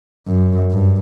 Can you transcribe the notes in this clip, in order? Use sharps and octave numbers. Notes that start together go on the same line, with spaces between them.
F#2
G2